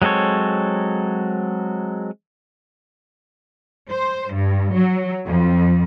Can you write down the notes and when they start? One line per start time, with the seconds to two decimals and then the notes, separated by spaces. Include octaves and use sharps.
0.02 F#3 G#3 C4 A4 C#5
3.90 C5
4.30 G2
4.71 F#3
5.26 F2